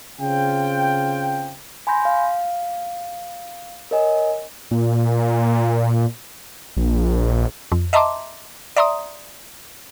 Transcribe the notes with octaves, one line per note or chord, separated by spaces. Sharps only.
C#3 C4 F4 G5
G#5 B5 C6 G6 A#6
F5
A#4 C#5 D#5 G#5
A#2
A#1
F2
D#5 E5 A5 A#5 C6 D6
D5 E5 A#5 C6 D#6